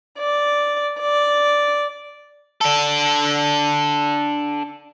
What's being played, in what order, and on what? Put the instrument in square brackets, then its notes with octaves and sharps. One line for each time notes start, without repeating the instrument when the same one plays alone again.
[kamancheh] D5
D5
[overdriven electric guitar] D4 A4